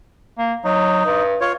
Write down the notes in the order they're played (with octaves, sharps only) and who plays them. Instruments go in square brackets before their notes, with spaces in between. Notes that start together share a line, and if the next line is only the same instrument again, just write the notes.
[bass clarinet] A#3
[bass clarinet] F#3 [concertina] D#4
[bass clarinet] G2
[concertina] F4 C#5